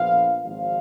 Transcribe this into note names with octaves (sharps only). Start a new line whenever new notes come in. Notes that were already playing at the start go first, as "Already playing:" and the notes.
Already playing: A#1 A#2 F3 B3 F4 F5
G#1 G#2 F3 F5